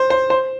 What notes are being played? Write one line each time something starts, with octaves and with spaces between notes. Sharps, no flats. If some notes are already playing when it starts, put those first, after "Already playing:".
Already playing: C5
C5
C5